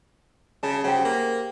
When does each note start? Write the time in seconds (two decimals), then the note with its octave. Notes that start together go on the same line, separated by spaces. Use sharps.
0.63 C#3 A5
0.84 C#3 G4 C5 F#5
1.05 A#3